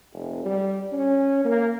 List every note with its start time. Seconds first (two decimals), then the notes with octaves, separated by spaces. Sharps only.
0.14 F1
0.45 G3
0.93 C#4
1.45 A#3